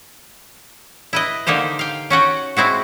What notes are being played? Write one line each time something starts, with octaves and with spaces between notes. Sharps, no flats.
E4 B4 D#5
D3 A#3 D#4 G4 C5
F5 G5
C#4 F#4 F#5 G5
G#3 C4 E4 F#4